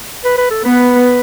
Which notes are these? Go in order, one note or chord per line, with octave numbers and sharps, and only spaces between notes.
B4
B4
A4
B3 B4